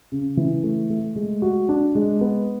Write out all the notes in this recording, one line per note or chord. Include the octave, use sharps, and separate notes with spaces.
C#3
E3
A3
A3
G#3
F#4
D4
G#3
B3